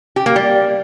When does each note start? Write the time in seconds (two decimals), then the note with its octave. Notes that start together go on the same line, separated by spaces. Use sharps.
0.16 G4
0.26 A#3
0.36 G3